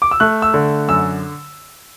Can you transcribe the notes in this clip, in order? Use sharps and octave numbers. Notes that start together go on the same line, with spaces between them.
D6
E6
A3 F#6
E6
D3
F#2 E6